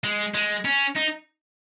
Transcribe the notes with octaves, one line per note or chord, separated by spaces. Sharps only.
G#3
G#3
C#4
D#4